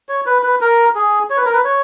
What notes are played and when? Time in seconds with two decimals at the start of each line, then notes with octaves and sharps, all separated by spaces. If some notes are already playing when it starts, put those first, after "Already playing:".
0.09 C#5
0.26 B4
0.43 B4
0.61 A#4
0.95 G#4
1.30 C#5
1.37 B4
1.46 A#4
1.53 B4
1.65 C#5